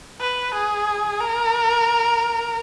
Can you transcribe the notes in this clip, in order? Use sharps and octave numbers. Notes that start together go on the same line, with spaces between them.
B4
G#4
A#4